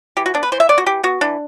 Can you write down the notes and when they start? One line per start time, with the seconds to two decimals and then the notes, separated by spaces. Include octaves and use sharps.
0.17 E3 G4
0.26 F#4
0.34 B3 D4
0.43 B4
0.52 E3 C5
0.60 E5
0.69 B3 D5
0.78 F#4
0.86 E3 G4
1.03 B3 F#4
1.21 E3 D4